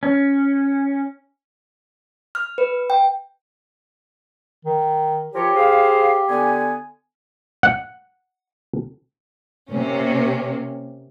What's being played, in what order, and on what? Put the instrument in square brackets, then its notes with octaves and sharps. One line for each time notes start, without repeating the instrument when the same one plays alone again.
[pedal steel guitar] C#4
[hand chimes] F6
B4
G5
[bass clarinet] D#3
[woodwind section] F3 A#4 C#5 [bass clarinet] G4
[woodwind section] G#4 C5 F5
D3 B3 G#5
[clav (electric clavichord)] F#5
[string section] C3 A#3 C#4